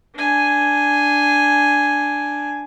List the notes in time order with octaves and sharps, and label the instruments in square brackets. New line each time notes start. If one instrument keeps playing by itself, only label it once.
[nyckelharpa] D4 G#5